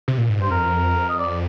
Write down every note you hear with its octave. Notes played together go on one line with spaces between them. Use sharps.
C3
A#2
G#2
G2 C5
F2 A#4
D#5
D5